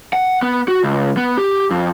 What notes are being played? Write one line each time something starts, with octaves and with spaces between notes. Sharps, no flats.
F#5
B3
F#4
C#2
B3
G4
F2